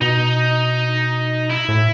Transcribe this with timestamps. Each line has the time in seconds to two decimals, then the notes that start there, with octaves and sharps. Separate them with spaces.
0.01 B2 D#4
1.50 E4
1.69 A2